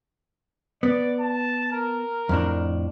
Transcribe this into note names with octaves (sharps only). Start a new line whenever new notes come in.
B3 D5
A5
A#4
F2 A2 D4